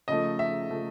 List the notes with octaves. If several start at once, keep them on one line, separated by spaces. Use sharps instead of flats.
C#3 F3 A3 D#5
E5
C#3 F3 A3